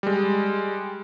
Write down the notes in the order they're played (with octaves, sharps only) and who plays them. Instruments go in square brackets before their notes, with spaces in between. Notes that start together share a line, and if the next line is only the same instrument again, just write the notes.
[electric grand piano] G3 G#3